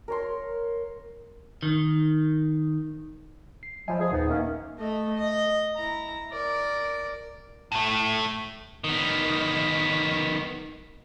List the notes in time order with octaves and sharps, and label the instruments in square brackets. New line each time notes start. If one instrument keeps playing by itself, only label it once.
[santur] A#4 C#5 C6
[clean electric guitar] D#3
[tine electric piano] C7
[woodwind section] F3 G3 [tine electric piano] D#5 E5 G#5
[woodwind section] F3 G#4
[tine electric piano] D#2 A#2 [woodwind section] B3 D#4
[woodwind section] D#3 A#3 C#4 [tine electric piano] E5
[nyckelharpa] A3 D#5
D#5
E4 A#5
A#4 D5
[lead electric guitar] A2 A3
[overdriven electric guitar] D#3 B3